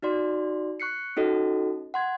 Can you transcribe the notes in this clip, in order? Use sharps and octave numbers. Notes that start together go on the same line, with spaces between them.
D#4 F#4 D5 C6
C#6 F#6 C7 C#7
C#4 D#4 F#4 A4 D#5
F#5 C6 G#6